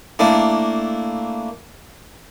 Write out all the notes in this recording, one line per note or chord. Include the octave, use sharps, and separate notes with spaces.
A3 A#3 D4 E4